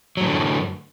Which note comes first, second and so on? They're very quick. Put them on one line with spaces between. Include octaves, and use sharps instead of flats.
F#3 A2 E3 D3 F#2